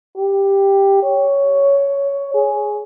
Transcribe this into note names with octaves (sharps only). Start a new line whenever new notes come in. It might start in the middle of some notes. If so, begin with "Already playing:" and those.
G4
C#5
G#4